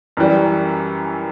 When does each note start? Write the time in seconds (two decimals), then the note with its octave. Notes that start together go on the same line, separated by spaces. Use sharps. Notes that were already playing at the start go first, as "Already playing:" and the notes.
0.17 F#2 E3 G3